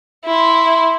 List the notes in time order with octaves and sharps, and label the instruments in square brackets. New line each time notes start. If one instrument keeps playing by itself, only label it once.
[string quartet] E4 C6